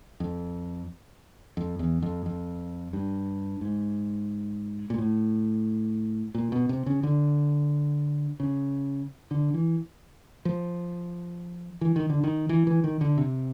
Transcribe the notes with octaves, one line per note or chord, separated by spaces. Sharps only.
F2
F2
E2
F2
F2
G2
G#2
A#2
A2
A#2
B2
C3
C#3
D3
C#3
D3
E3
F3
E3
D#3
D3
D#3
E3
E3
D#3
D3
C3